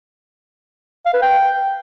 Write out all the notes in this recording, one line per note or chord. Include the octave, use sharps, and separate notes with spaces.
F5
B4
G5